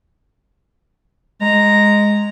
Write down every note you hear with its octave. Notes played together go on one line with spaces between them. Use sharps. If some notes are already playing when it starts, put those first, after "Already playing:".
G#3 A#5